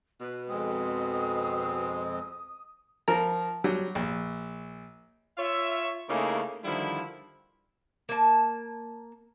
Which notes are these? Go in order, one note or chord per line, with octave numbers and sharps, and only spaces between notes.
B2 B4
F2 G#3 C4 D#6
F3 A#4 A#5
F#3 G3
A#1
F4 C#5 E5
C#3 A3 A#3 D#4 E4 G#4
D3 D#3 F3 G3 E4
A#3 A5